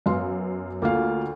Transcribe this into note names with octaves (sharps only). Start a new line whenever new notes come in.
F#2 B3 F5 C6
D2 A#3 F4 F5